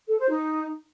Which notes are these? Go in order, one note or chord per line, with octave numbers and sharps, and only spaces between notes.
A4
C5
D#4